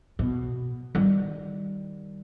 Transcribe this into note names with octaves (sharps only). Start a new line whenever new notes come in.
B2
D#3 G3